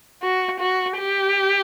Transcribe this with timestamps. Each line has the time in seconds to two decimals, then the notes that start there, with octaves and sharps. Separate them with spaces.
0.22 F#4
0.60 F#4
0.97 G4